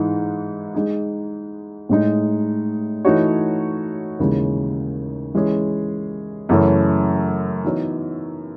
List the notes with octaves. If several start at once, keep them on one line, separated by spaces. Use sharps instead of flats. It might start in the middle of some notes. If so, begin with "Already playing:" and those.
Already playing: G#2 E3 G#3 D#4
G#3 D#4 G#4
A2 G#3 D#4
E3 A3 D#4 F#4 C#5
D#2 C#3 E3 G#3
E3 G#3 C#4 G#4
F#2 C#3 E3 A3 C#4
E3 B3 D#4 F#4 C#5